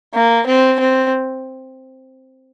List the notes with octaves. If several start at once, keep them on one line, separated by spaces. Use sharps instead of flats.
A#3
C4
C4